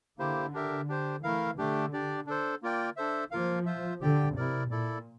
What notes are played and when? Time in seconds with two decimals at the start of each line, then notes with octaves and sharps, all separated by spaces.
0.18 D3 A#3 E4 G4 C5
0.54 D4 G4 A#4 E5
0.88 D4 G4 C5
1.23 E3 A3 E4 A#4 F5
1.57 D3 A3 D4 G4
1.93 D4 G4 D5
2.27 D4 A4 C5
2.62 A#3 F4 A#4 D5 G5
2.96 D4 A4 C5 E5
3.31 F3 A#3 F4 A#4 F5
3.66 F4 C5 E5
4.01 D3 G4 D5 G5
4.36 C3 E4 A#4 D5
4.70 A#2 E4 A4 D5